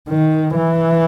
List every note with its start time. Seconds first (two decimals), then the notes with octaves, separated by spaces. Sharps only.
0.09 D#3
0.56 E3